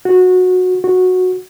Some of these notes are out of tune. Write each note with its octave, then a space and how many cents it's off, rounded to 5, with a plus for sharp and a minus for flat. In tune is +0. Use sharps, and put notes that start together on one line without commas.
F#4 -15
F#4 -10